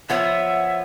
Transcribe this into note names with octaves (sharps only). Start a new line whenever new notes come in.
F3 B3 C#5 E5